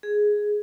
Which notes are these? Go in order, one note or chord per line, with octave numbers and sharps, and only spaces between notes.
G#4